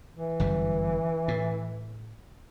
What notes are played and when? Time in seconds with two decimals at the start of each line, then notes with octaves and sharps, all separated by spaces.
0.15 E3
0.40 G1 F#2 G3
1.28 A2